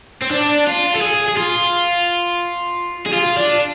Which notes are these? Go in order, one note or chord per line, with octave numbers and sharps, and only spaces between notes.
C4
D4
F4
A4
G#4
G#4
F4
G#4
F4
D4